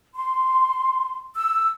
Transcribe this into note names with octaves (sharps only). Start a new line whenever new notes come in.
C6
E6